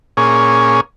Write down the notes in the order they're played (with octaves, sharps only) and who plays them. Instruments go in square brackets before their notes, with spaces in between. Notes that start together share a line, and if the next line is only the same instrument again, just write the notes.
[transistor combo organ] A#2 C#4 G#4